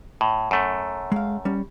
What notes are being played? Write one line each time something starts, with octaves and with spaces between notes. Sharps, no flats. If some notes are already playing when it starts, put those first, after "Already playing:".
A2
F#2 A3
G#3 F5
G3 C#4